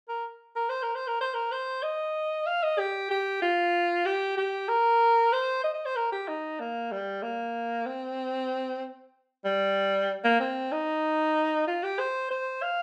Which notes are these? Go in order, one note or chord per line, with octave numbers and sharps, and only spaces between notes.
A#4
A#4
C5
A#4
C5
A#4
C5
A#4
C5
D#5
F5
D#5
G4
G4
F4
G4
G4
A#4
C5
D#5
D#5
C5
A#4
G4
D#4
A#3
G3
A#3
C4
G3
A#3
C4
D#4
F4
G4
C5
C5
F5